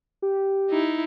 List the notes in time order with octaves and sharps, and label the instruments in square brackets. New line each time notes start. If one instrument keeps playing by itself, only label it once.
[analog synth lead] G4
[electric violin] D#4 E4